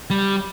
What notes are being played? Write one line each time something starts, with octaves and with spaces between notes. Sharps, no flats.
G3